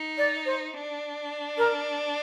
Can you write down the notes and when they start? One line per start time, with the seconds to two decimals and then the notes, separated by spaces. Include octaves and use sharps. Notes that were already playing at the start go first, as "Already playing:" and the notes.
Already playing: D#4
0.18 D5
0.46 C5
0.74 D4
1.58 A#4